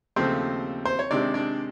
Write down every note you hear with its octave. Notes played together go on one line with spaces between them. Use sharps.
D#2 C#3 F3 A3 C4 C5
C5
C#5
C3 D#3 G#3 C4 D4 D5
D4 D5